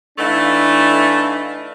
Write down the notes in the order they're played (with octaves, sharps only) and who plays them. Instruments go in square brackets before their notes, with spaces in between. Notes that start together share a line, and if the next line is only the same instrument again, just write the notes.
[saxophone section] E3 A3 [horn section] D4 D#4 F5